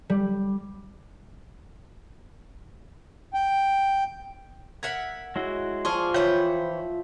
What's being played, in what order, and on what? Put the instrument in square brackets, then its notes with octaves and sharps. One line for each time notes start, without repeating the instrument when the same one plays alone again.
[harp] G3
[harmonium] G5
[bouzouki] A#4 E5 F#5 [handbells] G#6 B6
[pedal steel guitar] G#3 E4 F#4 [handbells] C#5
[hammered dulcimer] F3 [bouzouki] G#4 D5 [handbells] C6 C#6 F6
[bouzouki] E3 C5 C#5 [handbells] F4 E5 [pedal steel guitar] G5 B5